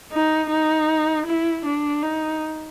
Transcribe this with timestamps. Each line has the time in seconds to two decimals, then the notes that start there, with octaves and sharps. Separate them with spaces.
0.12 D#4
0.50 D#4
1.27 E4
1.65 D4
2.03 D#4